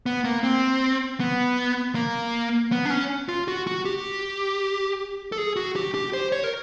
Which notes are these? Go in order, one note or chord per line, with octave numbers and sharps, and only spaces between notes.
B3
A#3
C4
B3
A#3
B3
D4
C#4
F4
F#4
F#4
G4
A4
G#4
F#4
G4
G4
C5
C#5
A#4